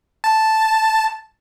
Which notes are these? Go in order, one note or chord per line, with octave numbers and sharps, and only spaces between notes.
A5